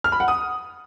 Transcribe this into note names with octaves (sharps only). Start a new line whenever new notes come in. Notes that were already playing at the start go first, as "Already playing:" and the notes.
F6
B5
F#5
D#6